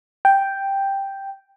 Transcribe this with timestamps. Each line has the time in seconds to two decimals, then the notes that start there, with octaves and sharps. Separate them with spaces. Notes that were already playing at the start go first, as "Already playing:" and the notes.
0.25 G5